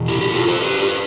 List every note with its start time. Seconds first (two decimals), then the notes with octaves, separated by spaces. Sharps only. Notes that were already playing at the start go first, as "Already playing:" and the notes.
Already playing: E2 B2
0.08 E4 G4
0.21 E4 G4
0.34 F4 A4
0.47 A4 C5
0.61 G4 B4
0.79 G4 B4